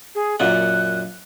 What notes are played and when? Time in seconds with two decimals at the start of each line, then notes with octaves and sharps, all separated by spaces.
0.15 G#4
0.40 F#2 A#2 F#5 F#6